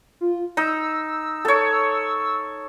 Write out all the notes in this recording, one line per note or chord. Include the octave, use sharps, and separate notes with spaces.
F4
D#4 E6
A4 C#5